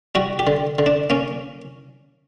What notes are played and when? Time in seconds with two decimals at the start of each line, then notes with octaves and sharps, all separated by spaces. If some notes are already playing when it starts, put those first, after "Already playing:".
0.15 G3 F#4
0.39 G4
0.47 D3
0.79 D3
0.86 D4
1.10 A#3 C#4